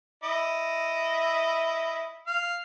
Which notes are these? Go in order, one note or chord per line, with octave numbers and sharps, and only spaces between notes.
E4 D#5
F5